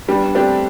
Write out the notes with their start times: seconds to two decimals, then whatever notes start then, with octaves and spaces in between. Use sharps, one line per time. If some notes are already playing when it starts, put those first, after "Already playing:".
0.08 G3 B3 D4
0.23 D4
0.35 A3 C4 D4 G4